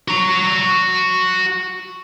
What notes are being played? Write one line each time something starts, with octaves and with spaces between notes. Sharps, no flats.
F#4 A#5